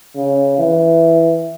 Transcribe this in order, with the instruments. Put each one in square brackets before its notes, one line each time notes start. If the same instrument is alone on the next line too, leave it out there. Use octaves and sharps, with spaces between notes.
[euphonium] C#3
E3